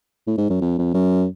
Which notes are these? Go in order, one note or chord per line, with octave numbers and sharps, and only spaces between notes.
A2
G#2
F#2
F2
F2
F#2